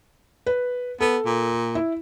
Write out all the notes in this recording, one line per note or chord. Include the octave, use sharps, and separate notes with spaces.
B4
B3 A4
A#2
E4